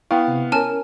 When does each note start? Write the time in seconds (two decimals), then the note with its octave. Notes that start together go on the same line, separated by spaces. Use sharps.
0.11 B3 E4 F5 G5
0.28 C3
0.52 C#4 A#4 G#5 A5 F6